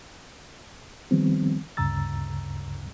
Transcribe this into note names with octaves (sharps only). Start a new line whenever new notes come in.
D#3 F3 G3 B3 C4
D2 G2 C#3 A#5 E6 A6